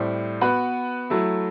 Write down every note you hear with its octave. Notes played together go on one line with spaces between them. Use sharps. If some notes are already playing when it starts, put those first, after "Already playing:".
Already playing: A2 G3 C4
B3 F#4 B4
F#3 A3 E4